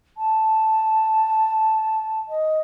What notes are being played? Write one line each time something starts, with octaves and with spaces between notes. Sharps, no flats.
A5
D#5